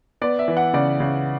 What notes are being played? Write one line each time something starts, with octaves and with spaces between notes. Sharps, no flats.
B3 D5
E5
E3
F#5
C#3 D5
C#3